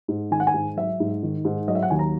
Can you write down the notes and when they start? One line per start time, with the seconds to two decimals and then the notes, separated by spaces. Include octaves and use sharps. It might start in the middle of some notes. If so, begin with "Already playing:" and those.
0.08 G#2
0.31 D#3 G#5
0.40 F#5
0.47 G#5
0.54 G#2
0.77 F#3 E5
1.00 G#2
1.23 D#3
1.45 G#2
1.68 F#3 D#5
1.75 E5
1.83 F#5
1.90 D#2 G#5
1.99 A#5